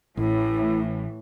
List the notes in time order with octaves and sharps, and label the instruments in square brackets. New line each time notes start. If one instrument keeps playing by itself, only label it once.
[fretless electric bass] A1 [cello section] A2 E3 [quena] E4